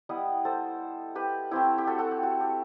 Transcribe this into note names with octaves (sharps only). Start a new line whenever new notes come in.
G3 B3 E4 B4 D#5
A4 C5
G4 B4
A3 C4 E4 G4
G4
F#4 A4
F#4 A4
G4
F#4
G4